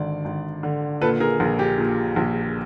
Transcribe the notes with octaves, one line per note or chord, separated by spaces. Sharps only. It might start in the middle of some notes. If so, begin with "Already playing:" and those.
Already playing: G#1 D3 D5
G#1
D3
A#2 A4 B4
G#4 A#4
A#1
G4
A#2
A#1